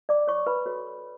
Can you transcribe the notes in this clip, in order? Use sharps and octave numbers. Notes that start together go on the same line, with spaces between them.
D5 D6
C#5 C#6
B4 B5
F#4 A4 C#5